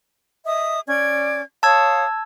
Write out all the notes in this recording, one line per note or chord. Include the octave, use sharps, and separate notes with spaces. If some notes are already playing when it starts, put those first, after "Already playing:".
D#5 E5 D#6
C#4 D5 G#6
C#5 F5 A5 D#6 E6 G#6